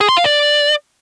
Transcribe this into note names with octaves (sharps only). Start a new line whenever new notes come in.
G#4
C6
F5
D5